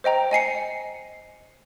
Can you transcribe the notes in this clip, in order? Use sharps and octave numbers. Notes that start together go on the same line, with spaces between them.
C5 D#5 G5 A#5
D#5 G#5 C7 C#7